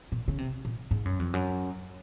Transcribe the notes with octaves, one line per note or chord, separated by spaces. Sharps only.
A#2
C#3
C3
A#2
G#2
F#2
F2
F#2